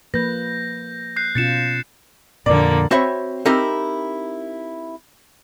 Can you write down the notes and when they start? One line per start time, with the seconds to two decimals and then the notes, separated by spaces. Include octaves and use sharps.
0.14 F3 A#3 B4 G6 A#6
1.16 F#6 G6 C7
1.35 B2 C#4 F4 A6 C#7 E7
2.46 F2 A#2 D3 A#3 D5
2.91 C4 F#4 C5 C#5 E5 B5
3.46 C4 D#4 E4 G4 A#4